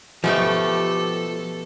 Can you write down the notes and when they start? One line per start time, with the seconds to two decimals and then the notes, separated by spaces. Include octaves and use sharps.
0.24 B2 F3 A3 G4 A4 G5